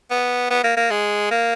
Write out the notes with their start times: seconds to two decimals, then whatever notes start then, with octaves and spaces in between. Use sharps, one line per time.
0.10 B3
0.50 B3
0.64 A#3
0.77 A#3
0.90 G#3
1.30 A#3